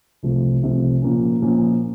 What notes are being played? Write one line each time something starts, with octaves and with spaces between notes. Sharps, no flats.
C2 C3 F3 A3
C2 C3 F3 A3
A#2 F3 A#3 C#4
A#2 F3 A#3 C#4